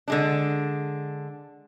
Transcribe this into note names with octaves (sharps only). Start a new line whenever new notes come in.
D3 G#3 D4